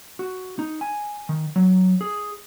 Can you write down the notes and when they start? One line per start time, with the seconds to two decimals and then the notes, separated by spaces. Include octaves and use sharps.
0.19 F#4
0.59 D#4
0.81 G#5
1.29 D#3
1.56 F#3
2.01 G#4